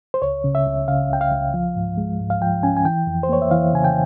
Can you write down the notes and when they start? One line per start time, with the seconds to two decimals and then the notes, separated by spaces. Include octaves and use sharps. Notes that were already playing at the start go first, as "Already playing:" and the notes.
0.14 C5
0.22 C#2 C#5
0.44 C#3
0.55 E5
0.66 C#2
0.88 C#3 F5
1.10 C#2 G5
1.21 F5
1.32 C#2
1.54 F3
1.76 G#2
1.97 G#3
2.20 G#2
2.30 F5
2.41 F3 G5
2.63 C#4 G#5
2.77 G#5
2.85 E3 G5
3.07 F2
3.23 C5
3.29 A#3 C#5
3.42 E5
3.51 E3 F5
3.73 C#3 G#5
3.84 G5